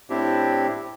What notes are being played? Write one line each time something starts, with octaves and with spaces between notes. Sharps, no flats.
A2 C4 D4 E4 G4